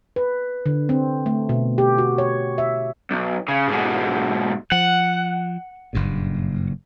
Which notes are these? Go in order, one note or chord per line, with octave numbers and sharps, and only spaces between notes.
B4
D3
C4
A3
B2
G4
F#4
C#5
E5
B1
C#3
G#2 B2
F3 F#5
F#1 G2 A#2